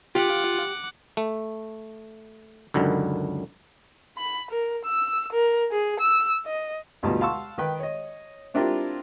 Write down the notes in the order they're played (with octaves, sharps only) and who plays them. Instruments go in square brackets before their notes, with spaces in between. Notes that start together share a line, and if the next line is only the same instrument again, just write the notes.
[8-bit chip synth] F4 [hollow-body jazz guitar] G4 [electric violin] F#5 D6
[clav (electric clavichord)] A3
C#2 F#2 D3 D#3
[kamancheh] B5
A#4
E6
A#4
G#4
E6
D#5
[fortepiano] D2 G2 B2 D#4 F4 A5
F5 F#5 A5 C6 C#6 E6
D#3 B4 G5
C#5 D#5
C4 D4 E4 F4 G4 A#4